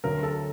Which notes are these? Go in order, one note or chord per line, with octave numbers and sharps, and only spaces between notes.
D2 D3 F#3 A#4
A4